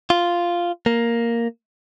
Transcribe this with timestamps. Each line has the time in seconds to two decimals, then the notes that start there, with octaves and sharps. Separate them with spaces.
0.10 F4
0.86 A#3